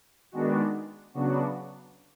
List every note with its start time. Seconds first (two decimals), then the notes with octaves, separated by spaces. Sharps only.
0.32 D#3 G#3 B3 D4 F#4
1.14 C#3 F#3 B3 D4 F#4